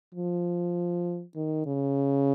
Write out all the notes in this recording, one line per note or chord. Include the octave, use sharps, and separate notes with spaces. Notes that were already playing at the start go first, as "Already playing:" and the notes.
F3
D#3
C#3